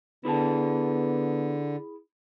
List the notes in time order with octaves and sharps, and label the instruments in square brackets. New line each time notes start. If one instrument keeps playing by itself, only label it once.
[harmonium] D3 [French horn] B3 [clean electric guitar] E4 G#4 A5